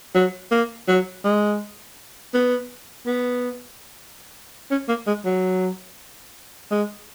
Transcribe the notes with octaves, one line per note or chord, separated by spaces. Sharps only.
F#3
A#3
F#3
G#3
B3
B3
C#4
A#3
G#3
F#3
G#3